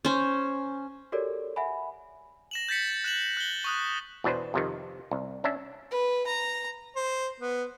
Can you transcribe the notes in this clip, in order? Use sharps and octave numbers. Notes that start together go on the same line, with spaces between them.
C#4 C5
F#4 G4 A4 A#4 C#5 D5
E5 F#5 G#5 B5
A#6 E7 F#7
G6 A6 B6 C#7
F#6 E7 F#7
F#6 G7
C#6 D#6 F#6
E2 B2 D4 B4 C5
F2 C3 D#3
C2
C#4 D4 E5
B4
A#5
C5
B3